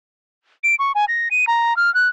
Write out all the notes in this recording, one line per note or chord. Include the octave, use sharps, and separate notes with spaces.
D7
C#6
G#5
A#6
D#7
A#5
F6
F#6